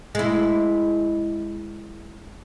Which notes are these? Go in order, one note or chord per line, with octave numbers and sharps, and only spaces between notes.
G#3 E4